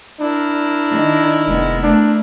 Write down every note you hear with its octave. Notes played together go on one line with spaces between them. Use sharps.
D4 E4 A#4
D#3
F1 G#3 B3
A3 D4